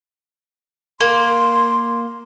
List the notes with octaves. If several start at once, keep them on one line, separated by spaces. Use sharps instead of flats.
A#3 C6